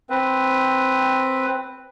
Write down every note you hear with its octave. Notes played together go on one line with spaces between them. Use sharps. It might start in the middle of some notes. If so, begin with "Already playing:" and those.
C4 B4